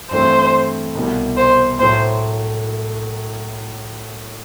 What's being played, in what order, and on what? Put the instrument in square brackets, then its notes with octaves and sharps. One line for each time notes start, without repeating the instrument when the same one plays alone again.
[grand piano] G2 E3 A3 C4 [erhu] C5
[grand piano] C2 B2 G3
[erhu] C5
[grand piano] A2 F#3 A3 [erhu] C5